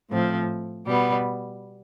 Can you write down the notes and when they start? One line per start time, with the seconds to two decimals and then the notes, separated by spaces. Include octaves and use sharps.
0.10 A2 F3 C4
0.86 B2 G3 B3